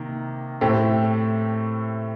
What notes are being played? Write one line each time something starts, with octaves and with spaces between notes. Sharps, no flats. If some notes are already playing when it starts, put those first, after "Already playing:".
Already playing: C3 D#3 A#3
A2 A3 C4 G4